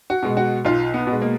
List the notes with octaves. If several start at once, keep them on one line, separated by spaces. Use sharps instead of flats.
F#4
B2 G#3
F#4
B1 F4
B3
B2
G#3
A#3